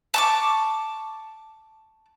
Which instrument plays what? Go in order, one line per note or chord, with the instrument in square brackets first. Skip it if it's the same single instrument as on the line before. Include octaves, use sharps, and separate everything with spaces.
[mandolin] A5 C#6 D6